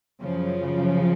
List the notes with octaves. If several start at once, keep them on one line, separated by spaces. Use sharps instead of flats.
F#2 C#3 F3